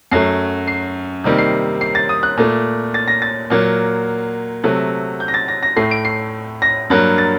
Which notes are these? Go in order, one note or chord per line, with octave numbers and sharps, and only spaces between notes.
F#2 F#3 A3 C7
C7
C3 D#3 G3 A#3
C7
C7
A6
D#6
F#6
A#2 A3
A6
A#6
A6
A#2 F#3 A#3
C3 F#3 A3
G6
A#6
A6
A#6
A#6
A2 A3 C7
D7
C7
A#6
G2 F#3 A#3
A6